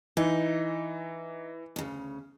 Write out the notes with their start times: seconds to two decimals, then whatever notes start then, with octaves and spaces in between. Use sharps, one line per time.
0.17 E3 D#4
1.76 D2 C#3